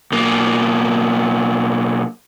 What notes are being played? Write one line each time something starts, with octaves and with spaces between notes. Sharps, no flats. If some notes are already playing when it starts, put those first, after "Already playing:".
B1 A#3